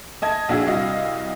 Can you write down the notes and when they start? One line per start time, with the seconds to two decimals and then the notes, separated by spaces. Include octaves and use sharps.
0.22 D#5 A5 G#6
0.49 A#1 D4 F#4 G#4 F5 E6
0.66 C2 F#4 D#5 F5